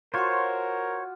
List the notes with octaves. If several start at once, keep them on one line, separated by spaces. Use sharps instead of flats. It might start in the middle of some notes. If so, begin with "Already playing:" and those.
F4 F#4 A#4 C5 C#5 D6